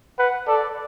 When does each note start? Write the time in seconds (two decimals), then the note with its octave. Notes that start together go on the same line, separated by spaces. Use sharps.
0.18 B4 F#5
0.47 A4 D5